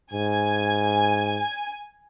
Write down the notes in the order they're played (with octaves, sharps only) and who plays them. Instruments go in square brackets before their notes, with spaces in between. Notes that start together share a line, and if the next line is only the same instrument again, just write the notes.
[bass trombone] G#2 [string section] G#5